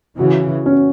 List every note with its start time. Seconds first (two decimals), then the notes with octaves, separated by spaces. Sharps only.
0.18 C#3 E3 F#4
0.66 C#4